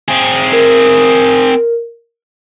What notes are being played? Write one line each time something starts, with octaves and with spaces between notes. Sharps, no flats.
C4 G#4
A#4